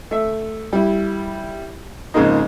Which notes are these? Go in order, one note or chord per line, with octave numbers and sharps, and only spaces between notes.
A3 E5
G3 E4
F2 G#2 C#3 G#3 A#3 D#4